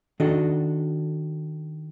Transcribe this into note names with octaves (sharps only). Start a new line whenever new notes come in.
D#3 D4 F#4 A4 D#5